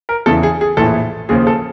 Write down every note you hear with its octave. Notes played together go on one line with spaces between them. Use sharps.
A#4
E2 C#3 E3 A4
G#4
G#4
A#1 A2 E3 A4
D#2 C#3 F3 G#4
A4